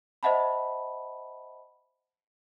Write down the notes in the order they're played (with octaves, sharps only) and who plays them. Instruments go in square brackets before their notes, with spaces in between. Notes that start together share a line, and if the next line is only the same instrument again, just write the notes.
[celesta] C5 D#5 E5 F#5 A5 B5